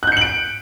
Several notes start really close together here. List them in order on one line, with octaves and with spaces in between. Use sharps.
F#6 G6 C#7 F#7 D7